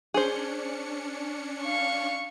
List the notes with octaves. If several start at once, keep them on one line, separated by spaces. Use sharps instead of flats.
C#4 D4 G#4 C5 C#7
F5 C#6